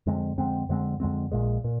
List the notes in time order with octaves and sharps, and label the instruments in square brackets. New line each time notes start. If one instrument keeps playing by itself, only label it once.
[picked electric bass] F2 D3 G#3 C4
F2 D3 G#3 C4
F2 D3 G#3 C4
F2 D3 G#3 C4
A#1 A#2 G#3
A#2